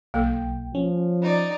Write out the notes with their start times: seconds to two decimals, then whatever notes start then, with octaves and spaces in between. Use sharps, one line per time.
0.14 B1 A#3 A4 G5
0.75 F3 C#4
1.22 D#4 D5